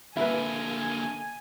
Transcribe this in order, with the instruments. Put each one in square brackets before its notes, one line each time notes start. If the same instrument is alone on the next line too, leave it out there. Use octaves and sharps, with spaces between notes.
[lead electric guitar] D3 A#3 [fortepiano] E4 B4 [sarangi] G#5